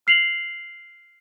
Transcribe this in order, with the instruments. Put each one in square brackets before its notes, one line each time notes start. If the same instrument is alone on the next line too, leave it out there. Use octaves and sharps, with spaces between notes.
[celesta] F6 C7 F7 F#7